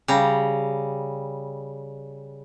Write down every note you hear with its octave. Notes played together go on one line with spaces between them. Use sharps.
C#3 G3 A#5